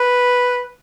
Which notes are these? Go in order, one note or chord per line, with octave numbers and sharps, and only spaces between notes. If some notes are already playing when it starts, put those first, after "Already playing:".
Already playing: B4